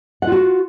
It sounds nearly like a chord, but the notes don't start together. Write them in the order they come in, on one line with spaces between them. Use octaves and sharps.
F#5 F4 F#4